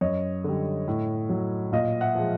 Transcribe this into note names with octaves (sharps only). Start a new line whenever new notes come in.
F#2 C#5 D#5
D3 G3
A2
F#3
A#2 D#5 F5
E5 F#5
F3 G#3